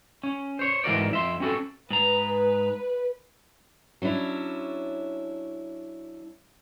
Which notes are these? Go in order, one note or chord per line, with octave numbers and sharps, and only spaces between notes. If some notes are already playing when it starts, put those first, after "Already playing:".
C#4
C5 C#5
G#2 E3 F#4 A#4 D5
F2 E5 C6
C4 C#4 F#4 A4
G#2 B4 A#5
F#3 C#4 D4 E4